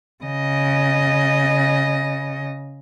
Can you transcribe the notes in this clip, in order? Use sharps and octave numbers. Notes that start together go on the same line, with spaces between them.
C#3 D#5